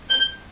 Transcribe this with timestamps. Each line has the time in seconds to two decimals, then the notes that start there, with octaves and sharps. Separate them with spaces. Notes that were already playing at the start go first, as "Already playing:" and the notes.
0.10 G6